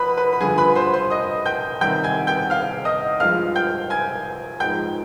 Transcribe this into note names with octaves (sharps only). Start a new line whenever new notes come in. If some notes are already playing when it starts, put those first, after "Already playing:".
Already playing: F2 B4 B5
B4 B5
B5
G2 D3 F3 G#4 G#5
B4 B5
C5 C6
C5 C6
D#5 D#6
G5 G6
C3 D#3 G3 G5 G6
G#5 G#6
G5 G6
F5 F6
D#5 D#6
G2 F3 G#3 F5 F6
G5 G6
G#5 G#6
G#2 F3 G#3 G5 G6